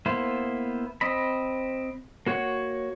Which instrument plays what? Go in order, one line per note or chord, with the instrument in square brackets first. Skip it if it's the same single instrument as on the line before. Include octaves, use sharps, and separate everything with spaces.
[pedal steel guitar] A#3 B3 E4 C5
C4 D#5 B5
A#3 F#4 C#5 F#5